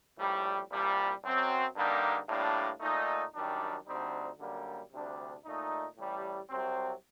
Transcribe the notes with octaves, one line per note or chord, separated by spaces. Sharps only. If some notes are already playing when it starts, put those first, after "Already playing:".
A#1 A2 G3
C2 A#2 G3
F#2 F#3 C4
G2 D3 G3 A#3 D#4
A2 G3 A#3 D4
A#2 A3 D#4
F#2 D#3 G3 D4
D2 D3 G3 C4 D#4
F#2 D3 G3 A#3
D2 C3 G3 D4
A#2 A3 D#4
A1 A2 G3
C2 C3 F#3 C4